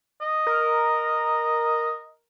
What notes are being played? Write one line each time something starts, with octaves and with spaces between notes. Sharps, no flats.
D#5
A#4